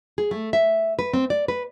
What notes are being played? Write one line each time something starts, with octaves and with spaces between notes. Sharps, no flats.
G#4
A3
E5
B4
C4
D5
B4